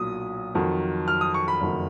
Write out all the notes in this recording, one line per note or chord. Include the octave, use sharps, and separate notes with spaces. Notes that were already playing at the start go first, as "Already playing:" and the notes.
Already playing: B1 A#2 F#3 D#6
F2 D#3 F#3
F6
D#6
C#6
B5
F#1 F2 D#3 F#3